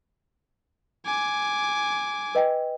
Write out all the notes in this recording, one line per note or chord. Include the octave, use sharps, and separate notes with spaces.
G#5 D6
B4 D#5 G5